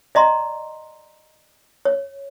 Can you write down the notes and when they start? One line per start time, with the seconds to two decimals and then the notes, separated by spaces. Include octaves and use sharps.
0.15 D5 D#5 A#5 C6
1.85 C#5